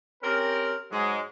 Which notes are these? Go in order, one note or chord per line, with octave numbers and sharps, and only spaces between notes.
C4 C#4 G4 A#4
G#2 F#3 G#3